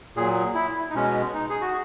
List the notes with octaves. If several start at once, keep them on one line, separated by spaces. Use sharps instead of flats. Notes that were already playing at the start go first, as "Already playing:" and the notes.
A#2 F#3 G#4
E4
D#4
B2 G#3 C#4
D#4
G#4
F#4